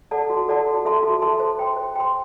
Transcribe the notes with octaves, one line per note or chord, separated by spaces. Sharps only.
A4 D5 F#5 A5
F#4
A4 D5 F#5 A5
F#4
A4 E5 A5 C6
F#4
A4 E5 A5 C6
C5
G5 C6
C5
G5 C6